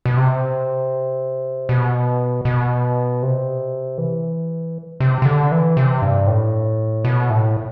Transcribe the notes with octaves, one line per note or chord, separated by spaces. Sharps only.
B2
C3
B2
B2
C3
E3
C3
C3
D3
E3
C3
G2
A2
B2
A2